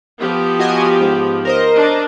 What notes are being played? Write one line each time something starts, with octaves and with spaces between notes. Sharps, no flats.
F3 B3 G4
F#4 D#5 G#5
G#2
A#4 C5 D#5
D4